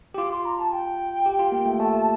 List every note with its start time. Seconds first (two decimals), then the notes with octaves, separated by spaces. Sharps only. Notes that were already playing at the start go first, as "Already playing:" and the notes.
0.14 G4
0.18 F4 D6
0.32 C6
0.46 A#5
0.59 A5
0.73 G5
1.26 G4
1.39 F4
1.52 A#3
1.66 A3
1.80 A3 A5